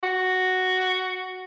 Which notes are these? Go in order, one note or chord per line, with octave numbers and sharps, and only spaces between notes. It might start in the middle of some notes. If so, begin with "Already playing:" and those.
F#4